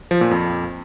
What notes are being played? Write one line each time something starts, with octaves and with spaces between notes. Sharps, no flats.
F3
A#2
F2